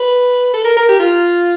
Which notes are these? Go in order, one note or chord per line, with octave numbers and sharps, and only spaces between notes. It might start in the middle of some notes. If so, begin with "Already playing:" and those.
Already playing: B4
A4
A#4
A#4
G4
F4